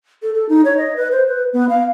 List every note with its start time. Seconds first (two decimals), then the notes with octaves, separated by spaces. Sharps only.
0.23 A4
0.34 A4
0.49 D#4
0.65 C#5
0.77 D#5
0.96 B4
1.12 C5
1.28 B4
1.53 B3
1.69 F5